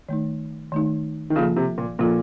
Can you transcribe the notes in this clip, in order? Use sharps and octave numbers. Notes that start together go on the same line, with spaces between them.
D#3 A3 D#4
D#3 A3 D#4
D#3
C#3 F3 A#3 F4 A4
C3
A#2
A#2 F3 A#3 F4 A4